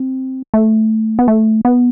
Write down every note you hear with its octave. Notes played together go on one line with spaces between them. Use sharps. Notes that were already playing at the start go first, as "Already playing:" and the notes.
Already playing: C4
A3
B3
A3
B3